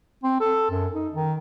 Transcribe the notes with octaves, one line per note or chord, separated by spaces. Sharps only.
C4
A4
F#2
D#4
D#3